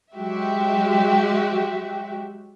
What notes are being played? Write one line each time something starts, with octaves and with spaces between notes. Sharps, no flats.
F#3 G#3 F#4 G4 E5